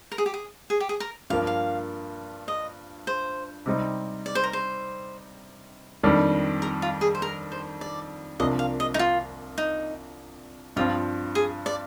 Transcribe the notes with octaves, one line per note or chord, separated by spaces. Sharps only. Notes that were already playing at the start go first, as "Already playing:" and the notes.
A#4
G#4
G4
G#4
G#4
G4
G#4
A#4
G2 F3 A#3 F5
F5
D#5
C5
C3 G3 C4 D#4
D5
C5
A#4
C5
F2 D#3 G3 D4
A#4
F4
G#4
C5
A#4
C5
D5
C2 C3 F3 A#3 D4 D#5
F5
D#5
D#4
F4
D#4
G2 F3 C4 F4
G#4
D5